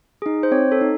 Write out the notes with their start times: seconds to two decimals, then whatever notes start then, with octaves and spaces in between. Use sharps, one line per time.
0.22 D#4 G#4
0.43 C5
0.51 C4 C#5
0.72 A4
0.81 D#4